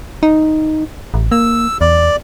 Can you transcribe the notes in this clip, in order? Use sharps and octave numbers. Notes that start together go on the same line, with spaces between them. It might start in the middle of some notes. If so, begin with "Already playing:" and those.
D#4
A1
A#3 E6
E2 D5